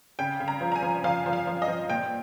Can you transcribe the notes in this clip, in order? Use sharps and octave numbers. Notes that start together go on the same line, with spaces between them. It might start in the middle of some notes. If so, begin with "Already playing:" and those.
C#3 G5
C#3
A#5
F3
A#5
G#5
F3
F3 F5
F3
F5
F3
D#5
F3
A#2 G5